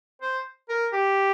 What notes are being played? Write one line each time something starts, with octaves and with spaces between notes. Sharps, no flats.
C5
A#4
G4